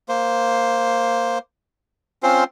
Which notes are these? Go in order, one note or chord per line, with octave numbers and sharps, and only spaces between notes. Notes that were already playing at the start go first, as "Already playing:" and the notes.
A#3 C5
C4 C#4 F4 C5